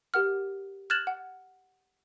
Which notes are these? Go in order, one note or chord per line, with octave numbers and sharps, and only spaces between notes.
G4 A#4 F#5 F6
F6 F#6 G#6 A6 E7 F#7
F#5